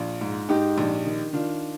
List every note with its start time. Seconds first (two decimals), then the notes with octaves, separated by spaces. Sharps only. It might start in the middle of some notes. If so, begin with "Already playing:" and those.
Already playing: A#1 F4
0.21 G#2
0.49 G#2 D#4 G4
0.78 A#1
1.05 D#3
1.33 D#3 D4 F4